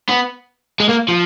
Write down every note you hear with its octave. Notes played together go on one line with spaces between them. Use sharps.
B3
G#3
A#3
F3